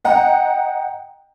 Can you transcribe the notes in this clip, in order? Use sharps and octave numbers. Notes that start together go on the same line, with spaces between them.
D#5 F#5 G5 A#5